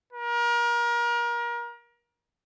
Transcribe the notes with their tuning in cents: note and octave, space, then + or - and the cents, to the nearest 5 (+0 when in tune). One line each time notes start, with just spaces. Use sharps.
A#4 +30